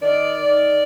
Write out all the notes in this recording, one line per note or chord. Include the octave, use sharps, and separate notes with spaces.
D#3 D5
D#3